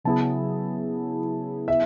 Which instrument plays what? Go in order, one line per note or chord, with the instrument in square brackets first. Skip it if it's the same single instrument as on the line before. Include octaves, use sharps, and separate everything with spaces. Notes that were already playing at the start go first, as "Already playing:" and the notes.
[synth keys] C#3 F#3 B3 E4 G#4 [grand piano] A5
[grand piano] E5